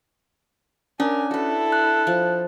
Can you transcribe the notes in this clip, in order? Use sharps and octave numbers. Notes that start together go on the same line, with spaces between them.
C#4 D4 A#4 G#5
E4 F#4 A4 B4
F#6
F3